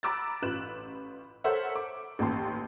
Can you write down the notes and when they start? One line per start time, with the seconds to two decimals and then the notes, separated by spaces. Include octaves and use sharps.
0.03 A#5 B5 D6 E6 F#6 A6
0.42 A1 F4 B4 F#6 E7
1.44 A4 A#4 C5 C#5 E5 F#5
1.76 D6
2.19 A1 D#2 A#2 G4 A5 C6